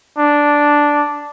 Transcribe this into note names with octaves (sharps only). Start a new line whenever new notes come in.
D4